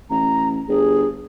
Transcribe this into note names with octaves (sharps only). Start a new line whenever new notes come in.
A1 A#5
G1 G#4